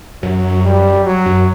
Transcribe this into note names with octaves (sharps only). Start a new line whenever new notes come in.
F#2 F#3
G3
F#3
F#2